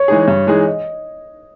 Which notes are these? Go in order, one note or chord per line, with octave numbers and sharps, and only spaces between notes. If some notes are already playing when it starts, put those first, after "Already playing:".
Already playing: C#5
E3 G#3 D#4 G#4
G2
E3 G#3 D#4 G#4
D#5